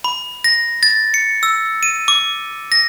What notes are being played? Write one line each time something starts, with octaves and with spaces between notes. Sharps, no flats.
B5
A#6
A6
C#7
E6
D#7
D6
A#6